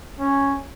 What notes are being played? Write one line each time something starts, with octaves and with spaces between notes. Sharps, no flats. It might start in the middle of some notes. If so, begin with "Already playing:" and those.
C#4